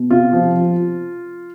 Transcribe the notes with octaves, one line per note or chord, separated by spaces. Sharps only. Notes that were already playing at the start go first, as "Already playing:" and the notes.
Already playing: B2
C3 F4
F3
F3